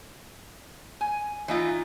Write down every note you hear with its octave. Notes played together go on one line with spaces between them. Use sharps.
G#5
E3 D#4 F4